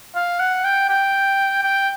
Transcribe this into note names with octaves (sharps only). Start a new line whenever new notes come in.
F5
F#5
G5
G5
G5